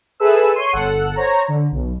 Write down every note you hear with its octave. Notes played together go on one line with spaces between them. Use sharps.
G#4 A4 B4 E5 E6
C#5 C6 D#7
G1 A4 F#5
C5 C#5 A#5
D3
B1